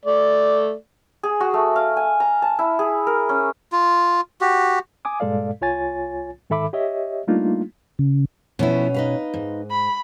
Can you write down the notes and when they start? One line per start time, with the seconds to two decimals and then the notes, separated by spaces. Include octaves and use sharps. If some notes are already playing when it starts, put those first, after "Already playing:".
0.05 A3 D5
1.23 G#4
1.40 F#4
1.54 A3
1.76 F5
1.97 G#5
2.20 A#5
2.42 A5
2.59 E4
2.79 G#4
3.07 A#4
3.29 C#4
3.72 F4
4.41 F#4 G4
5.05 G#5 D6 D#6
5.20 G2 A#2 G#3 A4 D5 F5
5.61 C2 F4 C#5 G#5 A6
6.50 G#2 D#3 A4 E5 B5 D6
6.73 G4 C#5 D#5 E5
7.27 G3 A3 A#3 D4 D#4 F4
7.99 C#3
8.59 B2 F3 B3 C#4 E4
8.94 D#4 B4 F5
9.34 G#2
9.71 B5